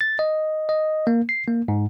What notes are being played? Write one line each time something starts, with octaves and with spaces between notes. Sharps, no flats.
A6
D#5
D#5
A#3
C7
A#3
G#2